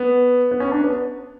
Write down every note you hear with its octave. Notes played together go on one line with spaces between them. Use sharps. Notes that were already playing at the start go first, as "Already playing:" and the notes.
Already playing: B3
B3
C#4
D4
B3